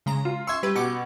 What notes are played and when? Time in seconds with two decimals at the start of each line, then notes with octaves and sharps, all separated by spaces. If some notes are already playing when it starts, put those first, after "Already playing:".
0.06 C#3 G#3 A#5
0.25 F4
0.47 E5 C6 C#6 E6 G#6
0.63 G3 G4 B4
0.75 B2 G4 D6 C#7